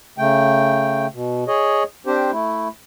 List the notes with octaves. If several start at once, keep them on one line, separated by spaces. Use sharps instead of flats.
C#3 A3 G5
B2
G#4 C#5 D#5
C4 D4 G4 C5
A3 E4